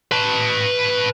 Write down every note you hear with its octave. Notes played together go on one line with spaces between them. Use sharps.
B4 A5